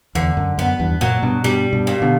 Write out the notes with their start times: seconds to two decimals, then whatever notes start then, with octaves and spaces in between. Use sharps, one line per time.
0.15 E2 D3
0.37 F#2
0.58 F#2 B3
0.80 E2 G2
1.01 F#2 A#2 F#3
1.22 G2 B2
1.44 G2 B2 G3
1.73 G2 B2
1.87 A#2
2.02 B2 D3